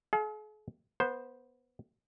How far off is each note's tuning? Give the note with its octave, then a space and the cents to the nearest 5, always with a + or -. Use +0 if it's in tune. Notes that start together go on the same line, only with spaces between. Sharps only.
G#4 +45 F5 +0
B3 -15 C5 +0